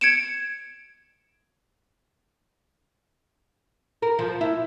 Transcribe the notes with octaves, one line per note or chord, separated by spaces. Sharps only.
G#6 C#7 D7 E7
A#4
F3
E4